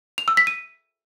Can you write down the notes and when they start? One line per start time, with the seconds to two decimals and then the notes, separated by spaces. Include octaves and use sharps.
0.18 F7
0.28 E6
0.37 B6
0.47 D#7